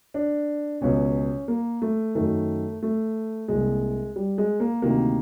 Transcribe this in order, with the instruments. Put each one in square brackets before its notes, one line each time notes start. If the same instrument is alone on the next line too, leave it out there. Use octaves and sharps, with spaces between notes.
[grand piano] D4
C#2 B2 C#4
A#3
A3
F#2 D#3 A3
A3
C2 A#2 G#3
G3
G#3
A#3
D2 C3 D#3 A#3